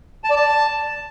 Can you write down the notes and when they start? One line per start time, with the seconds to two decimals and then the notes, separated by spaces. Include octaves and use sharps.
0.24 A5
0.30 D5
0.36 A5